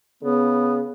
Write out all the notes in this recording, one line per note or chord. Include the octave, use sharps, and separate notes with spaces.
C#3 B3